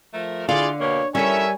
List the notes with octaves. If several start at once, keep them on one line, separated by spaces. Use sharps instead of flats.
F3 A3 A#4
D3 E4 F4 G#4 D5 F5
B2 A#3 G4 C#5
G3 C#4 E4 A4 A#4 C#5 E5 G#5